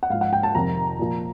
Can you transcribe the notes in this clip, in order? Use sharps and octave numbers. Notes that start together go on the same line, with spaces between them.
F#5
G#2 F3 F5
F#5
G5
A5
F2 C3 D#3 A#5
A#2 F3